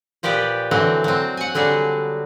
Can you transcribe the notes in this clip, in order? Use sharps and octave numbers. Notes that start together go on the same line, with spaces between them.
A#2 F3 G4 B4 D5
D3 E3 F#3 C4
F#3 C4
F#5 G#5
D3 F#3 G3 G#4